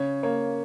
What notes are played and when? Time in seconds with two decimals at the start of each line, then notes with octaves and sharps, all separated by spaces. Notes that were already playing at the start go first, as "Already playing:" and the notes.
Already playing: C#3 C#5
0.23 A#3 C#5